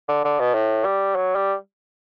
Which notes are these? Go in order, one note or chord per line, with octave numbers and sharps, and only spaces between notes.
D3
D3
B2
A2
G3
F#3
G3